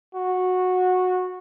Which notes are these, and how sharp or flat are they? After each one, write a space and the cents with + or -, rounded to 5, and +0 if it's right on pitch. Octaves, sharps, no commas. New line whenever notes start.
F#4 -15